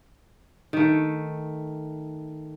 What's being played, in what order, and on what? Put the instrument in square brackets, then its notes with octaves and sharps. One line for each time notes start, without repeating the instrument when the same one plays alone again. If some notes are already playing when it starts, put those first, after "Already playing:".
[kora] D#3 A3